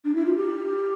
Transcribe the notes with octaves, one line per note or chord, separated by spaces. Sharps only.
D4
E4
F4
G4